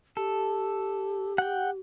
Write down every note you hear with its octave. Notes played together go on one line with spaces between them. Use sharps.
G4 A4
F#5 G5